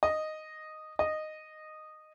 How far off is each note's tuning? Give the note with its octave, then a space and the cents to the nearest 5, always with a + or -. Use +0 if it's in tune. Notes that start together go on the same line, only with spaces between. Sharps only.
D#5 -5
D#5 -10